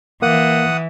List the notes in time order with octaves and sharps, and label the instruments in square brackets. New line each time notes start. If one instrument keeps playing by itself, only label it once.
[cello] E3 [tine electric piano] A#3 [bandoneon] F#5 D#6